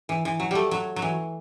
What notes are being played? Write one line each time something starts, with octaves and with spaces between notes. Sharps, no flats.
E3
E3
F#3
G3 A3
F#3
F#3
E3